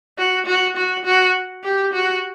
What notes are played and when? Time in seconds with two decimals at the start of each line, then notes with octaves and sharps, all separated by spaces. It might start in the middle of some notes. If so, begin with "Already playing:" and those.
0.18 F#4
0.46 F#4
0.77 F#4
1.05 F#4
1.64 G4
1.93 F#4